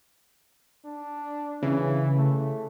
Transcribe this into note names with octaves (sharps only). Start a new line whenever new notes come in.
D4
C#3 E3
A3